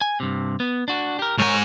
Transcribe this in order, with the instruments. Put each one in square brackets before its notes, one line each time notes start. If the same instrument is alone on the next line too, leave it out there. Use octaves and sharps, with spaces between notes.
[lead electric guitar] G#5
G2 C3
B3
D4 F#4
G4 A#4
[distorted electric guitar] G#2 G#5 [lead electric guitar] A#4 C#5